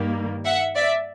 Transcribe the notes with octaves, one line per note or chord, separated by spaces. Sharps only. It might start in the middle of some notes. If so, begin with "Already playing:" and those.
Already playing: G2 D#3 G3 A#3
E5 F#5
D5 E5